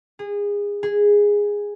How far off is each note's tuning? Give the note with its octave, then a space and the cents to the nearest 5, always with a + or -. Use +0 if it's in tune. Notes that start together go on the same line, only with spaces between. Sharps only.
G#4 -25
G#4 -10